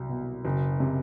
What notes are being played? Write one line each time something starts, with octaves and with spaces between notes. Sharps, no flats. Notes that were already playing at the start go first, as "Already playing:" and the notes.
Already playing: C2 F#3
B2
F#1
C3